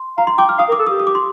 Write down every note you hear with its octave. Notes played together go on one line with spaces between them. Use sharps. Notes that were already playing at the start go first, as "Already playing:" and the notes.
Already playing: C6
F5 A#5
C6
G5 D6
F6
F5 D#6
A#4
D6
A4
G4 D#6
D#6
D6
C6